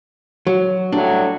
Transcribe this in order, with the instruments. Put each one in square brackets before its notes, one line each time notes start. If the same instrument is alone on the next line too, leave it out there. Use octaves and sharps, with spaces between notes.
[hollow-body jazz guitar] F#3
[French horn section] A2 F#3 G3 [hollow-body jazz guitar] D4